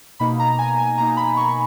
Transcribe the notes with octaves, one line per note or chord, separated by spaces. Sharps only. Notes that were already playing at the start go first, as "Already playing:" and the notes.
B2 A#3 D#4 B5
A#5
G#5
G#5
B2 A#3 D#4 A#5
B5
C#6